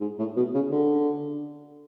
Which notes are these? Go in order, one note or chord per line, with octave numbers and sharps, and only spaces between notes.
G#2
A2
B2
C#3
D3